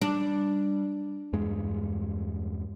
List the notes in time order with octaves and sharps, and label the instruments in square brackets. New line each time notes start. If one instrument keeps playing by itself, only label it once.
[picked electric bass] G3 [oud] D4
[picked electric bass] E2 G2 G#3